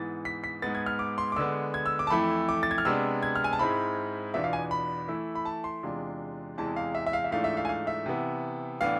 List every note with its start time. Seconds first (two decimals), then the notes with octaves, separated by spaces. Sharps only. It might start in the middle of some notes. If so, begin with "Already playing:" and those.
Already playing: G#2 E3 B3 A6
0.25 B6
0.44 B6
0.62 G#2 G#3 B3 A6
0.75 G#6
0.86 F6
0.99 D6
1.18 C6
1.32 D6
1.36 D3 G#3 B3 E6
1.74 G#6
1.86 E6
1.99 D6
2.07 A5
2.10 F2 E3 A3 E4 B5
2.49 D6
2.63 A6
2.71 G#6
2.78 F6
2.85 C3 G#3 B3 D4 E6
3.23 G#6
3.36 F6
3.44 G#5
3.53 A5
3.59 G#2 G#3 C4 E4 B5
4.34 E2 B2 B3 D4 F4 E5
4.44 F5
4.53 G#5
4.71 B5
5.08 E3 A3 E4
5.35 B5
5.45 A5
5.64 C6
5.83 E2 C3 G#3 D4 F4
6.58 E2 C3 E3 G#3 A5
6.76 F5
6.95 E5
7.06 E5
7.13 F5
7.24 E5
7.31 G#2 E3 A3 D4 F4 F5
7.44 E5
7.57 F5
7.65 G#5
7.69 F5
7.87 E5
8.06 C3 E3 B3
8.81 A2 E3 B3 D4 F5